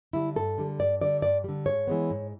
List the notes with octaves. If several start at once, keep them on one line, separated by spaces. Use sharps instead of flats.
D3 G3 E4
G2 A4
D3 G3
G2 D5
D3 G3 D5
G2 D5
D3 G3
G#2 C#5
E3 G#3 B3
G#2